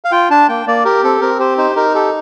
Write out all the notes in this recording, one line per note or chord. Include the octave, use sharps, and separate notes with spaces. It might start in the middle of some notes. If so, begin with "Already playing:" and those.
F5
F4 G5
D4 A5
A#3 G5
A#3 D5
G4 A#4
C4 A4
C4 A#4
G4 C5
D#4 C5
D#4 A#4
G4 A4